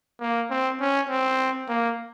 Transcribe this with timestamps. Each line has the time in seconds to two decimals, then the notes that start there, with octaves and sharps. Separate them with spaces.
0.21 A#3
0.50 C4
0.80 C#4
1.09 C4
1.68 A#3